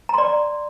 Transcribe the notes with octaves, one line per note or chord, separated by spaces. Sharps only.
D5 A#5 C6